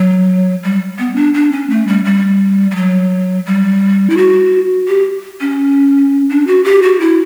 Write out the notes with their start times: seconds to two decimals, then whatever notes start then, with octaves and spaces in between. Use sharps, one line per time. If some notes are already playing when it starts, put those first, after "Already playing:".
Already playing: F#3
0.63 G3
0.99 B3
1.16 D4
1.34 D4
1.52 C#4
1.70 A3
1.87 G3
2.05 G3
2.71 G3
2.76 F#3
3.46 G3
4.10 E4
4.17 F#4
4.88 G4
5.41 C#4
6.30 D4
6.47 F#4
6.65 G4
6.83 F#4
7.00 E4